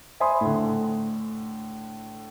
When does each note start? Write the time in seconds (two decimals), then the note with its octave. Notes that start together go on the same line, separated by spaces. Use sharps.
0.20 C5 E5 G#5 B5 C6 D#6
0.41 A2 D3